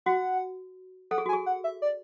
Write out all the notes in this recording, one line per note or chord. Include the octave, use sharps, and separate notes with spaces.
F#4 F#5
A4 F#5
G#4
F#4
G#5
G#4
F#5
E5
D5